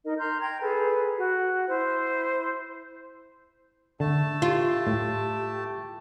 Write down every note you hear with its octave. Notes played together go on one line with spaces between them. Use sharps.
D#4 A#4 D#5
A#5 C6 F6 G6
G5 A#5 G#6
G#4 A4 B4
F#4
E4 C5
D3 A3 A5
F4 G4
A2